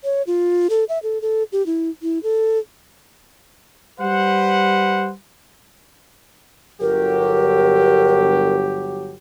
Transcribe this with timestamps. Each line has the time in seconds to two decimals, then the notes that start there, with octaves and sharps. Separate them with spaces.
0.04 C#5
0.27 F4
0.70 A4
0.89 E5
1.03 A4
1.22 A4
1.52 G4
1.66 E4
2.02 E4
2.23 A4
4.00 G3 B4 C5 F#5
6.81 G1 F#3 G4 A#4